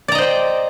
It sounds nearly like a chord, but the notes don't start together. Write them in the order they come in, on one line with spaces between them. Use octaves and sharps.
D5 A#5 D#5 C5 G5